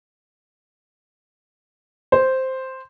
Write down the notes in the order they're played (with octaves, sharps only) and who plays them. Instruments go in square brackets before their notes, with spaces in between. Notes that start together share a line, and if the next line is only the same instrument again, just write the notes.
[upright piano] C5